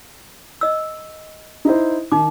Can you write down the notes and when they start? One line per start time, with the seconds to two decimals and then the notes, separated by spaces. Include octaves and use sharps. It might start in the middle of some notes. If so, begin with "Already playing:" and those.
0.61 D#5 E6
1.65 D#4 E4 C5
2.12 D#3 D#4 D6